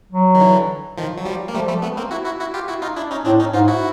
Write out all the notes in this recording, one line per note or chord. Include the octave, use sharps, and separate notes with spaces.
F#3
D#3
D3 E3
D#3 F3
F#3
F3 G3
A#3
F3 G3 A3
G3 A3
A3 B3
A#3 C4
E4 F#4
E4 F#4
E4 F#4
F4 G4
E4 F#4
D#4 F4
D4 E4
C#4 D#4
A2 C4 D4
C#4 D#4
G#2 D#4 F4
E4 F#4